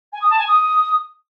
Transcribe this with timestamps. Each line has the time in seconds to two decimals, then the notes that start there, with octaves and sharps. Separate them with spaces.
0.12 G#5
0.21 D#6
0.30 A5
0.38 G#5
0.47 D#6